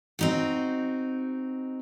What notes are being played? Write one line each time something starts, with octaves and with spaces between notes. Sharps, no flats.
C4 D#4 F#4